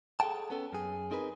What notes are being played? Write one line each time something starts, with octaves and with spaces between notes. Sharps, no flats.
G#4 A4 F#5 G5 A5
B3 C#4 A4
F#2 G#4
C4 D#4 G#4 A#4 B4